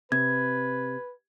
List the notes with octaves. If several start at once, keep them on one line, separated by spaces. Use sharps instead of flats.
C3 B4 G#6